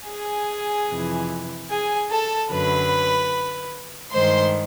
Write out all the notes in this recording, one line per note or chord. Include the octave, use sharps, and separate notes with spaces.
G#4 G#5
F2 C3 E3
G#4 G#5
A4 A5
F#2 D3 F#3 B4 B5
G2 D#3 G#3 C5 C6